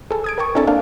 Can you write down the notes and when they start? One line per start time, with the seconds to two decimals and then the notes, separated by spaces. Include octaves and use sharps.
0.11 G#4 A4
0.24 D#6 G#6 D7
0.38 A#4 G5 A5 C#6
0.55 C4 D4 E4 A4 G#5 A5
0.67 A#3 D4 F5